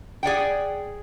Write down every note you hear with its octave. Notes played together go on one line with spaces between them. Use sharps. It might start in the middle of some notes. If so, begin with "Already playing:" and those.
G#4 D5 F#5 G5